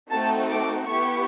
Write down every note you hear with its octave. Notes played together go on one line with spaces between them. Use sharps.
A3 C4 D#4 F#4 A4 A5
D6
B3 E4 G4 C#6